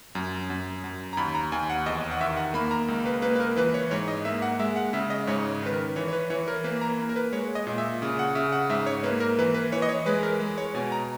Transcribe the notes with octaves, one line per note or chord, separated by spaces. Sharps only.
F#2
F#2
F#2
A#5
D#2 B5
A#5
D#2 G#5
F#5
E2 D#5
F#5
D#3 E5
F#5
A#3 B5
A#5
C#2
B4
A#3 B4
B4
A#4
E3 B4
C#5
G#2 C#5
D#5
A#3 E5
F#5
G#3 E5
F#5
C#3 E5
D#5
G#2 C#5
D#3 B4
A#4
E3 C#5
C#5
B4
E3 C#5
A#4
A#3 B4
A#5
A#3
A#4
B4
G#3 C#5
D#5
A#2
E5
C#3
F#5
C#3 E5
F#5
G#2 E5
C#5
A#3 B4
A#4
E3 B4
B4
E3 C#5
D#5
C#5
G#3 B4
A#4
G#3
C#5
B2 G#5
A#5